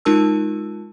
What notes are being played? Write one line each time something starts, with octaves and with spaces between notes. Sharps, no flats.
G#3 D#4 F4 A#4 A5 E6